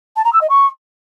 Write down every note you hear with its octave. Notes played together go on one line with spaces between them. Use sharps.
A5
A#5
E6
D#5
C#6